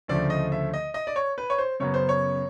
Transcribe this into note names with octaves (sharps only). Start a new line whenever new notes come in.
D2 C#3 F3 A3 D5
D#5
E5
D#5
D#5
D5
C#5
B4
C#5
C5
F#2 C#3 F#3 B3 C#5
C5
C#5